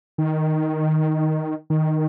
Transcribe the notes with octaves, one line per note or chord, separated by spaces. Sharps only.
D#3
D#3